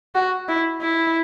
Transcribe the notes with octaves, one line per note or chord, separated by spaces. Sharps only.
F#4
E4
E4